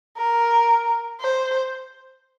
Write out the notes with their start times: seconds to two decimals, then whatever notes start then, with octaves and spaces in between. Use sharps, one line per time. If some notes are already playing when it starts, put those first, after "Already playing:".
0.17 A#4
1.19 C5